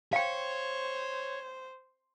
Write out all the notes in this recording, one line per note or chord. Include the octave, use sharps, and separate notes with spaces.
C5 C#5 F5 G5